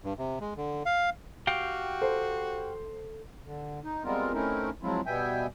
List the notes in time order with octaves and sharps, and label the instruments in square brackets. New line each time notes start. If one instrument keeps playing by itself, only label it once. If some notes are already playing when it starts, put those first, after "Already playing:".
[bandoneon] G2
C3
G#3
D3
F5
[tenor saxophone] F#4 [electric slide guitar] G4 F5 G5
[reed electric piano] A4 [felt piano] C5
[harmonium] D3
D#4
G3 G#3 B3 C4 F4 A#4
A3 C4 C#4 D#4 E4 A#4
F3 F#3 G#3 C4 E4 F4
B2 G3 B3 E5 G5 G#5